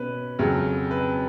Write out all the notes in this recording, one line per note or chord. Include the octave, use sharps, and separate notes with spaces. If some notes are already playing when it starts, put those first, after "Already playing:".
Already playing: B2 C#4 B4
F2 C#3 F#3
B4